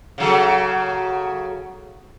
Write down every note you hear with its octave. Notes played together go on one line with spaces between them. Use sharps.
C#3 F#3 A4